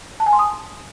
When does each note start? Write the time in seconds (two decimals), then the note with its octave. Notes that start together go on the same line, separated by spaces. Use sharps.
0.20 A5
0.26 G#5
0.33 C6
0.39 D#6